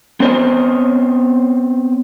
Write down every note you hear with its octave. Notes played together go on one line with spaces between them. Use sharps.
B3 C4 C5 C#5 D#5